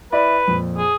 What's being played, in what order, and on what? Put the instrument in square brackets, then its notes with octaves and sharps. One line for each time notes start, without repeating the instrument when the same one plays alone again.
[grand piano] E4 D5 B5 [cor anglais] B4
[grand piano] F2 A#2
[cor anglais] G#4